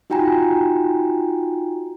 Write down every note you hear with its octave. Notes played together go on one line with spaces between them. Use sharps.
D#4 F4 F#4 G5 G#5 A#5